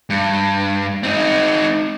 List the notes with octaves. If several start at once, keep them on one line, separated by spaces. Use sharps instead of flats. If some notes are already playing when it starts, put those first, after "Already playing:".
G2
C4 D#4